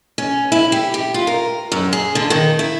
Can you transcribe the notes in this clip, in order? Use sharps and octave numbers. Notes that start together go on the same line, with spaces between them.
C#4
E4
G4
G4
F4
A#4
F#2
G#4
D3
D#3
E4